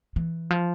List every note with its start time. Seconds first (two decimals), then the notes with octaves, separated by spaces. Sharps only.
0.16 E3
0.50 F3